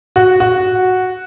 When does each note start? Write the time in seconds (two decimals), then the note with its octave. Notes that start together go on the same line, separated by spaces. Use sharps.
0.16 F#4
0.40 F#4